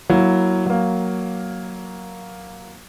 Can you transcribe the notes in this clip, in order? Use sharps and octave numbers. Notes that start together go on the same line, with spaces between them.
F#3 A#3 E4
F#3 A#3